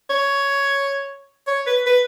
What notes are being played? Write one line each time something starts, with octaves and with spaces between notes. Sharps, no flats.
C#5
C#5
B4
B4